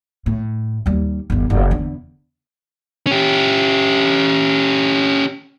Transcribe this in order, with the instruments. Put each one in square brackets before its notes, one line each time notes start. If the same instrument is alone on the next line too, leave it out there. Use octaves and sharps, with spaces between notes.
[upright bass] A2
D#2 G3
G1 D#2
F#1
E2 D3
[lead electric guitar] C#4 G4